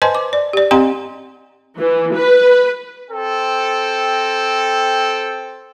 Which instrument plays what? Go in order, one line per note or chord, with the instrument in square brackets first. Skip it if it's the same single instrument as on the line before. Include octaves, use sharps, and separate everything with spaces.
[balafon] B4 C5 D#5 G#5 A5 C6
D6
D5
G4 D5
C4 G4 D#5 F#5 A#5 C6
[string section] E3
B4
[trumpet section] C4 A4 G5